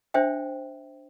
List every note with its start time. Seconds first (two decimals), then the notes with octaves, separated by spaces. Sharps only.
0.14 D4 C5 E5 G5